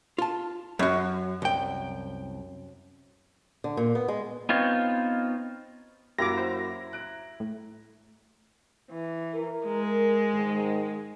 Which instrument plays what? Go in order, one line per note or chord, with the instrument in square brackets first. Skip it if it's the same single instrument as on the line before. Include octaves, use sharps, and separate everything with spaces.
[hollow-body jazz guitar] F4 A5
[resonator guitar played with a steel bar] F#2 [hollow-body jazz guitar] F#3 F#4
[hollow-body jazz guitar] C2 G5
[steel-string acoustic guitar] D3
A#2
B3
G#3
[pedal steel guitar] B3 C4 D#4 F4 C#5
[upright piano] F#2 A#3 F#4 [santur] E4 A#5 [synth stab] G4 D6 [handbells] A#6
[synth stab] C5
[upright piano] F#6 D7
[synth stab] A2
[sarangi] E3
[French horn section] A#4
[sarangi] G#3
[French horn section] G#2 D#3